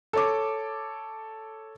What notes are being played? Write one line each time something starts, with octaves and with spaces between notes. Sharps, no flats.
A4 C#5 D6